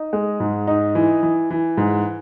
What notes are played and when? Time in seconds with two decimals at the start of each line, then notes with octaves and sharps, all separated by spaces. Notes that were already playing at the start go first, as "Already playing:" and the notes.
Already playing: D#4
0.13 G#3
0.40 G#2
0.67 D#4
0.95 E3
1.23 E3
1.50 E3
1.77 G#2